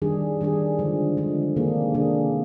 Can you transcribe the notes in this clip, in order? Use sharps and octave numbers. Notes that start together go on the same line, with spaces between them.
D#3 G3 D4 G#4
D#3 G3 D4 G#4
D3 F3 G#3
D3 F3 G#3
C3 D#3 A#3 D4 G#4
C3 D#3 A#3 D4 G#4